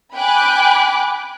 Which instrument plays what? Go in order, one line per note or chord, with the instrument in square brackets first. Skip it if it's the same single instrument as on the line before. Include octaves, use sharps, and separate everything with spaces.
[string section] G5 G#5 B5 D6 F#6